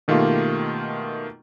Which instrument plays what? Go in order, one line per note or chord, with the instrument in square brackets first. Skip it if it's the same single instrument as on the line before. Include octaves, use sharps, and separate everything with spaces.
[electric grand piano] B2 D#3 A3 A#3 F4 G4